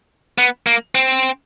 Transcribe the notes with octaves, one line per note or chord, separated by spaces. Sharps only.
B3
A#3
C4